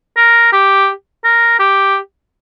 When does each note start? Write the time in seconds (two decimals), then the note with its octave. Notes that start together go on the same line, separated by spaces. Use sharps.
0.17 A#4
0.53 G4
1.24 A#4
1.59 G4